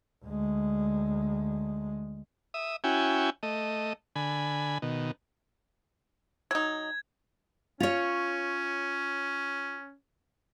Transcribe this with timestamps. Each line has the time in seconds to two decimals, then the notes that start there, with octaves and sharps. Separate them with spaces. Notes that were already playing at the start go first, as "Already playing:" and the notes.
0.24 D2 G#3
2.54 E5 D#6
2.84 C#4 E4 F#4 G5 G#5
3.43 A3 D#5
4.16 D3 G#5 B5
4.82 B2 D#3
6.51 F#3 D#4 G#6
7.80 C#4 F4 C#5